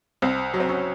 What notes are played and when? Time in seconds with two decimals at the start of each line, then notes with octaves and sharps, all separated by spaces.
0.22 C2 C4
0.54 F#3
0.60 C4
0.69 C#4